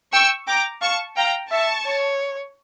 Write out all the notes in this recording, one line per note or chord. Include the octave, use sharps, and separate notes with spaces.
G5 C#6 E6
G5 A#5 D6
F5 A5 C#6
F5 G5 A#5
E5 A5 C#6
C#5